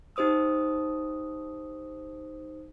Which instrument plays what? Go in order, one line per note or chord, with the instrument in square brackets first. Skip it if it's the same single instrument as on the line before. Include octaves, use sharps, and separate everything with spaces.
[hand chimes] D#4 G4 C5 D#6 E6